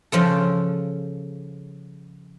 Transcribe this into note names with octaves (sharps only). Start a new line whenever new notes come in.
C#3 F3 F4 A4